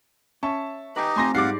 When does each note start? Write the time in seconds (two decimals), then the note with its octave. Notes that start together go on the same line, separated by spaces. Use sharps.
0.43 C#4 E5 A5 C#6
0.96 D#4 G4 B4 D#5 G5 G#5
1.16 A3 C4 F4 G#5 C6 A#6
1.35 G#2 G3 D5 F5 F#5 D6 C7